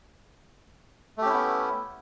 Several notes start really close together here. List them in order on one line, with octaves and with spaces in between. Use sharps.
A3 G4 C#4 E4 B3